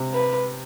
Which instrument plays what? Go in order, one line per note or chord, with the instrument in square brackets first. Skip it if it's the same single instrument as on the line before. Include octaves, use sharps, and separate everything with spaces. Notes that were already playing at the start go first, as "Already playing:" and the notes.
Already playing: [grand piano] C3
[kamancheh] B4